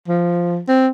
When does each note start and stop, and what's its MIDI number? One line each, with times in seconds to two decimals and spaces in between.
0.08 0.59 53
0.68 0.89 60